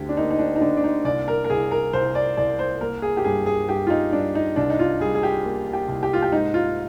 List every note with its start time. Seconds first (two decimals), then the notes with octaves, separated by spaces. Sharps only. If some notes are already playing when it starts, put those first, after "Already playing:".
Already playing: D2 D3 G4
0.09 D4
0.17 A#3 D#4
0.31 D#4
0.39 D4
0.56 D#4
0.61 D3 D4
0.77 D4
0.84 D#4
1.05 C2 D5
1.28 A#4
1.45 A#4
1.49 C2 G#4
1.71 A#4
1.93 C2 C5
2.15 D5
2.37 C2 D5
2.59 C5
2.81 A#3 A#4
3.02 G#4
3.17 G4
3.24 G2 G#4
3.46 G#4
3.68 G2 G4
3.87 F4
3.90 D#4
4.12 G2 D4
4.35 D#4
4.56 C2 D4
4.70 D#4
4.79 F4
5.00 G3 G#4
5.15 G#4
5.23 G4
5.45 A#3
5.73 G4
5.88 C2
6.03 G4
6.13 F4
6.22 G4
6.32 G#2 D#4
6.54 F4